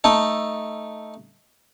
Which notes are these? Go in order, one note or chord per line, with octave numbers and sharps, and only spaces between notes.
A3 D#4 A4